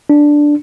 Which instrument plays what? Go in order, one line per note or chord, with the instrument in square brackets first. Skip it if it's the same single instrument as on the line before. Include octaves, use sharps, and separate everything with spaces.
[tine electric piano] D4